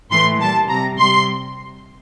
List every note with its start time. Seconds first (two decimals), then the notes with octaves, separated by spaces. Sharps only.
0.11 A2 E3 A3 C6
0.41 A#2 G3 A5
0.69 C3 G3 A#5
0.99 C3 G3 C6